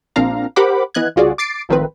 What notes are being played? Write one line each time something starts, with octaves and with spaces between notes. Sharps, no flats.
A#1 C4 D4 F5 A#5
G4 A#4 C5 F#5 B5 D6
E3 B3 D#5 F#6 G#6
C2 C#3 F4 F#4 G#4 D5
D6 A6 C7 D7
G#1 A2 D#3 F3 C4 B4